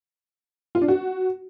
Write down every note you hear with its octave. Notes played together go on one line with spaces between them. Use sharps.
F4
D4
F#4